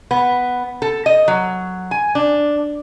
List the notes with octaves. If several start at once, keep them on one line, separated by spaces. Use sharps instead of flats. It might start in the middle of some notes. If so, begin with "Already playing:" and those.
B3
A4
D#5
F#3
G#5
D4